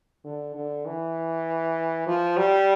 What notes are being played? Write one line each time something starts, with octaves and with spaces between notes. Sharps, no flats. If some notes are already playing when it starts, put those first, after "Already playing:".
D3
D3
E3
F3
G3